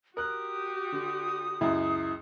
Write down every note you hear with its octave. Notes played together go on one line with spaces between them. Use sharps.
F#4 G4 A#4 D#6 F#6
D3
C#2 F#2 E4